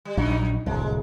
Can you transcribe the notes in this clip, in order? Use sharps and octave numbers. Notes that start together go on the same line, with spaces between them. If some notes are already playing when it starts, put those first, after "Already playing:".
G3
A#1 F#2 F#3 D#4
D1 C2 G#3